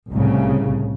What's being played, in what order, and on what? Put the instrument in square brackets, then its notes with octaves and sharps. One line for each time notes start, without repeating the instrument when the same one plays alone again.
[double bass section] C2 A2 C#3